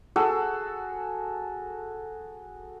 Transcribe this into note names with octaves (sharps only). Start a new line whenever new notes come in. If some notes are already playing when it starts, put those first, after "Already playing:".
F#4 G#4 A4